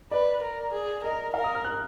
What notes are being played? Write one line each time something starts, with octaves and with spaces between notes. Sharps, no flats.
B4 D5
A#4
G#4
A#4 D#5
A#4 F5
D#6
F6
F#6